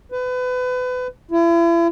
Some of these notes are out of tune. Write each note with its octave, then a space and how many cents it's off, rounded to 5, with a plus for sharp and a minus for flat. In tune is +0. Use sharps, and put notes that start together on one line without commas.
B4 +30
E4 +40